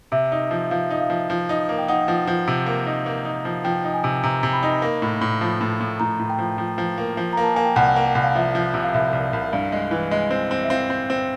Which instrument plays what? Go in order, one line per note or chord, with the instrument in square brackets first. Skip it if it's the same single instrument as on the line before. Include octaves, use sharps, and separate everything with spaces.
[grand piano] C3 [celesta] E5
[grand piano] D#4
F3
[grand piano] F3 [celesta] F5
[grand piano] D#4
[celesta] F5
[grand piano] F3
[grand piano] F3 [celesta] F5
[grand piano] D#4
A#3
[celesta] G5
[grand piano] D#4 [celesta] F#5
[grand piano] F3
F3
C3
A#3
D#4
A#3
D#4
F3
[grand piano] F3 [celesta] G5
[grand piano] D#4
[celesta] G#5
[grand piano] C3
[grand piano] C3 [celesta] A#5
[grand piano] C3
[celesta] B5
[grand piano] D#4
A#3
A2
A2
F3
A2
A2
[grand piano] A2 [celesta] A#5
[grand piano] A2
[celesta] G5
[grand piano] F3
F3
F3
A#3
F3
[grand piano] A#3 [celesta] A#5
[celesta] A5
[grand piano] A#3 [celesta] G#5
[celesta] G5
[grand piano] C2 [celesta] F#5
[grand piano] A#3
C2
[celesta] F5
[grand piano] F3 [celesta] E5
[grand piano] F3
C3
[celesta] F5
[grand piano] C2 [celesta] E5
[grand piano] C2
C2
[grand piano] G2 [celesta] F5
[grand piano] G#3
E3
G#3
C4
C4
[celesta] E5
[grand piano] C4 [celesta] F5
[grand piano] C4
C4